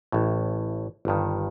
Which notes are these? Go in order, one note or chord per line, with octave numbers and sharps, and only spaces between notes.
A1 A2
G1 G2 D#3